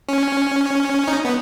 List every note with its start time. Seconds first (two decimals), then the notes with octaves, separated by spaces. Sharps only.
0.09 C#4
1.08 D#4
1.25 B3